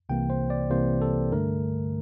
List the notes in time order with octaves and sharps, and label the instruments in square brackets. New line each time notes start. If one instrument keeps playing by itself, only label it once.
[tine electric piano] C2 C3 E3 A#3 G5
C5
D5
C2 C3 E3 A#3 C5
A4
G2 D3 A3 A#4